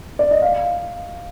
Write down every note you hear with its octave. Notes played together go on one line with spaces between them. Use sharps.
D5
D#5
F5